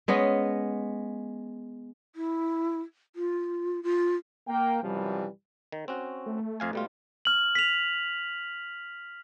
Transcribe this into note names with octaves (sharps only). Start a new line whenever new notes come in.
G#3 B3 C#4 D#5
E4
F4
F4
A#3 G5
F#2 C3 E3 F3 G3
D#3
C4 C#4 F#4
A3
F2 F5 G#5
B2 G3 F4
F6 F#7
B6 F7